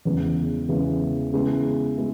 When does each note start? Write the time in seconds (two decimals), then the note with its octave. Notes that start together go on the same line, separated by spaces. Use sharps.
0.05 E2 C#3 E3 G#3 B3
0.69 E2 C#3 E3 G#3 B3
1.33 C#3 G#3 B3 E4
1.97 G#3 B3 E4